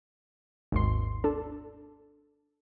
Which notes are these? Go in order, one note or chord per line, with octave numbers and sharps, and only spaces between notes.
G#1 D#2 C6
D4 A4